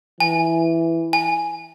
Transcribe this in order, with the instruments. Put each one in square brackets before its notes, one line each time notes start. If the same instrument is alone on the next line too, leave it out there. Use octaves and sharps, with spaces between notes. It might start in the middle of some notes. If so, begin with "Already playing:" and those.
[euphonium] E3 [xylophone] G#5
[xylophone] G#5